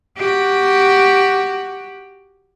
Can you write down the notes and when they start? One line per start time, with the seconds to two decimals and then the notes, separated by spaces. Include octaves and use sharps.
0.17 F#4 G4